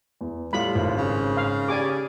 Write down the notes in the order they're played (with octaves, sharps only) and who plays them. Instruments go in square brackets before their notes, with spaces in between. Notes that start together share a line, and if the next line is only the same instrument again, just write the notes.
[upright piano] E2
[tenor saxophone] A2 [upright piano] G3 [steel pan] F4 B5
[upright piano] G#1 [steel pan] F4
[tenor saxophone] C#3
[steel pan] F5
[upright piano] G4 [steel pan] D5 G#5 D6